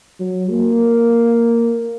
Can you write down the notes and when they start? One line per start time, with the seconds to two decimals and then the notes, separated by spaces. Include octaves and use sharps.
0.20 F#3
0.51 A#3